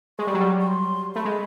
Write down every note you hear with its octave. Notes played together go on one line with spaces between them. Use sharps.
G#3 C#6
G3
F#3
G3
C#6
C6
A3 B5
G#3